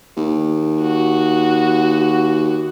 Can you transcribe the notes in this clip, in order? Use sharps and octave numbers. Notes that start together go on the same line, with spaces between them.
D#2
F#4